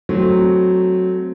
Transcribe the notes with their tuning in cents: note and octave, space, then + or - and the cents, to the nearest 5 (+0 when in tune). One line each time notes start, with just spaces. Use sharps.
F#3 +0 A3 +0 C4 +0